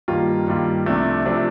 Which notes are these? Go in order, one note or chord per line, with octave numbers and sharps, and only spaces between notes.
G2 D#3 G3 A#3 F4
G2 D#3 G3 A#3 F4
C2 C3 F3 A3 D4
C3 F3 A3 D4